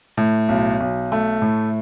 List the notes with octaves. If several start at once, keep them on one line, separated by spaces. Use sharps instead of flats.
A2
B1
B1
A3
A2